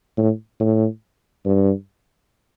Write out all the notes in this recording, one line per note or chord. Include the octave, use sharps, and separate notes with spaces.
A2
A2
G2